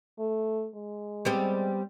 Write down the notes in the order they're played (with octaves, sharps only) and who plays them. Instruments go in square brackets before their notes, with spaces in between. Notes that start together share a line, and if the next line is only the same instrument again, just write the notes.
[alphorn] A3
G#3
[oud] G3 B3 C4